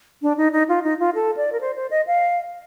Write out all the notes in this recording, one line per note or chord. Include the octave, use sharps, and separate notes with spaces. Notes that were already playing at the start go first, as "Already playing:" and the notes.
D4
D#4
D#4
F4
D#4
F4
A4
D5
A#4
C5
C5
D#5
F5